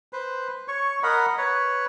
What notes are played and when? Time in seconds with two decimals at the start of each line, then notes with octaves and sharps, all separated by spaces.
0.13 B4 C5
0.68 C#5 C#6
1.03 A#4 D#5 F#5 B5
1.38 B4 C#5